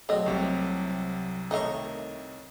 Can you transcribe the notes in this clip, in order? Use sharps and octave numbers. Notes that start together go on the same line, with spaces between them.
F#3 A3 C4 D#5
C2 C3
D#3 A3 D#4 C#5 D#5